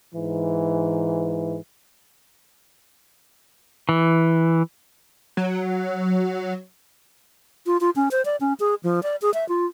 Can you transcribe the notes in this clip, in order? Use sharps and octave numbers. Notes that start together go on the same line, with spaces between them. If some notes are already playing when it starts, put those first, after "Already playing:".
G#2 E3
E3
F#3
F4
F4
C#4
C5
D5
C#4
G#4
F3
D5
G#4
E5
F4